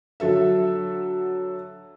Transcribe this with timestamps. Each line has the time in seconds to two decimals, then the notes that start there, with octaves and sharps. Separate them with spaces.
0.20 D3 F#3 A4 E5